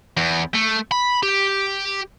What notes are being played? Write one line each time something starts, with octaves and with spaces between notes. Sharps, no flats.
E2
A3
B5
G4